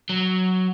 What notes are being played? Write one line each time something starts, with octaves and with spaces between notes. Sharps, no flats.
F#3